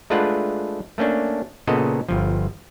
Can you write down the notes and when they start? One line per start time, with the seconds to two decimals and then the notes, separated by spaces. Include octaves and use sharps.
0.10 G#3 A3 D4 F4 B4 F#5
0.98 A3 A#3 C#4 D4
1.67 A#2 C#3 B3 A4 D#5
2.09 G1 F3